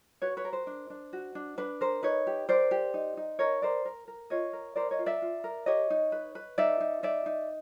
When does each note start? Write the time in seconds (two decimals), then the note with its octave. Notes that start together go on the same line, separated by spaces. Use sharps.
0.22 F#4 B4 C#5
0.37 B4 C#5
0.44 A#4
0.53 C5
0.67 D4
0.90 D4
1.13 F#4
1.35 D4
1.58 D4 B4
1.81 A#4 C5
2.03 D#4 B4 C#5
2.27 G4
2.49 A#4 C5 D5
2.71 G4
2.94 D#4
3.17 D#4
3.39 A#4 C#5 D#5
3.62 A#4 C5 D5
3.85 A#4
4.08 A#4
4.30 F4 C#5 D#5
4.53 A#4
4.76 A#4 C5 D5
4.91 C#5 D#5
4.99 F4
5.06 D5 E5
5.22 F4
5.44 A#4
5.66 G4 C#5 D#5
5.90 D#4
6.12 B4
6.35 B4
6.58 D#4 D5 E5
6.80 D#4
7.03 D#4 D5 E5
7.26 D#4